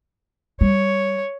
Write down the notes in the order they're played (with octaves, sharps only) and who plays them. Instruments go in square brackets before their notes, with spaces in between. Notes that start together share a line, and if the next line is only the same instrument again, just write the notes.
[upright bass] G3 [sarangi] C#5